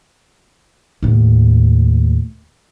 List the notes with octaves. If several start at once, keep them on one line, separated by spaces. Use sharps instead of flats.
D#2 A2